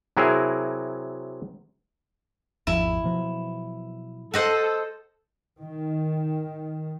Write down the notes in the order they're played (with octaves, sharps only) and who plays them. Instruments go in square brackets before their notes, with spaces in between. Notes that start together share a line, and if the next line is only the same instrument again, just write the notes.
[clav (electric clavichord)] C3 F#3 E4 G#4 A#4
[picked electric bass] G#1 E2 F3 [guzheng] E4
[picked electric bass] B2 F3 F#3
[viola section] A4 [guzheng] C5 D#5 F#5
[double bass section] D#3